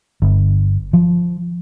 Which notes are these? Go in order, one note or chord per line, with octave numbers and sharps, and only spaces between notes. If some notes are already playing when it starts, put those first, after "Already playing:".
G1
F3